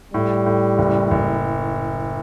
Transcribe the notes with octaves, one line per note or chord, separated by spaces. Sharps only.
A2 G3
A2
F#1
F#1